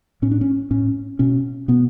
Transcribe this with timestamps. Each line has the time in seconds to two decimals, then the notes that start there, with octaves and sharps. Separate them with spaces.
0.22 A2 C#4
0.31 D4
0.41 C#4
0.71 A2 C#4
1.19 B2 C#4
1.68 B2 B3